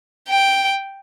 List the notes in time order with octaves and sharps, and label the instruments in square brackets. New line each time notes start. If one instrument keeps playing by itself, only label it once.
[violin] G5